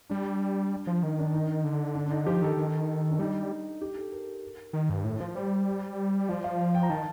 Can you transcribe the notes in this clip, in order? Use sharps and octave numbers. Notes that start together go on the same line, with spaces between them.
G3 D4
F3
D#3
D4
D#4
D3
D4
D4
D#4
F3 G4
D#3 A4
D#3
D4
G3 D#4
G4
A4
A#4
D#3
G2
A2
F3
G3 C5
F3 D5
F5
G5
A#5
D#3 A5